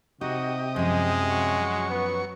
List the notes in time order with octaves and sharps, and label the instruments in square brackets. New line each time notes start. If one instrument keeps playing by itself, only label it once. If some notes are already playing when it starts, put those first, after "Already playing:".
[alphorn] C3 [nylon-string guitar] D#4 [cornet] F#4 [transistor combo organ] G4 D#5
[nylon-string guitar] F#2 F3 [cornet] G#3
[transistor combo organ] F#3 C#6
[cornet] B3 [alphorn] B4